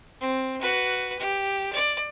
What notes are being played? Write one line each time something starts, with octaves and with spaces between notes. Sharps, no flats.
C4
F#4 B4
G4
D5